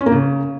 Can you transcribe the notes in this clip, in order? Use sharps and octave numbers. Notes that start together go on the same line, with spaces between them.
C#4
A#3
C#3